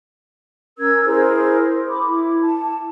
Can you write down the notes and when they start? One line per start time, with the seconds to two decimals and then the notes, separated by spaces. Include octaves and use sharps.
0.79 C#4 A#4 E6 G#6
1.05 E4 G#4 A#4 C5
1.89 B5 D6
2.06 E4
2.43 A5